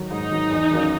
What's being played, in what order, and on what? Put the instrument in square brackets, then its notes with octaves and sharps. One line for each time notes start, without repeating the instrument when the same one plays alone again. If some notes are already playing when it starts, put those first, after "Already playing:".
Already playing: [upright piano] D#3 F#3
[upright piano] G#2 [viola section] D#4
[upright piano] D#3 F#3
E2
D#3 F#3 A#3 C#4